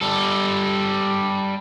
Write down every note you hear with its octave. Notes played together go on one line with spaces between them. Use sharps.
G3 A4